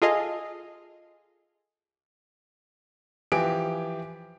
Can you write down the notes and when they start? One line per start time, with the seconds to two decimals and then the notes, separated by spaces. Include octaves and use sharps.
0.02 F4 G#4 A4 D#5 F5
3.32 E3 F3 G4 G#5 D7